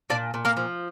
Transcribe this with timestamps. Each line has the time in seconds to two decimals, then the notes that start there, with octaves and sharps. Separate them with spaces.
0.10 A#2 D4 D5
0.34 A#2
0.45 A#3 A#4
0.57 F3